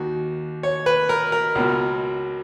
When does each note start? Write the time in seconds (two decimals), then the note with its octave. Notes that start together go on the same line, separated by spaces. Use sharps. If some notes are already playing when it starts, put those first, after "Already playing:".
Already playing: D#2 D#3 F#4
0.63 C#5
0.86 B4
1.09 A#4
1.32 A#4
1.55 C#2 B2